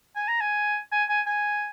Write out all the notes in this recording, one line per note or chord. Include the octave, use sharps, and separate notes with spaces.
G#5
A#5
G#5
G#5
G#5
G#5